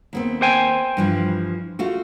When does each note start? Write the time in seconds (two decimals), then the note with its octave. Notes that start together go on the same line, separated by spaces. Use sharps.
0.13 D#2 B3 C4
0.42 C5 G5 G#5
0.97 G2 E3 F3
1.79 A3 F4 F#4